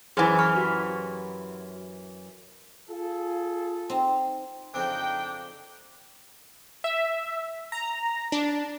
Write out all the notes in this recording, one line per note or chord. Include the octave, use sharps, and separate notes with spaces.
F#2 E3 G#4 C5 G#5
B5 C#6 F6
F#4 G4
F4 G#4 A4
C4 D#4
F2 C#3 C4 D4 D#4 G5
E5
A#5
D4